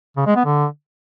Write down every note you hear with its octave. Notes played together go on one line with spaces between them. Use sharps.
C#3
G#3
B3
D3